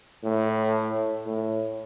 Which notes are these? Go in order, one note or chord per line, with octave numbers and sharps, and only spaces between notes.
A2
A2